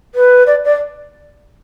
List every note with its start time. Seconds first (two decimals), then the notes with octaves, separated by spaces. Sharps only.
0.15 B4
0.46 D5
0.65 D5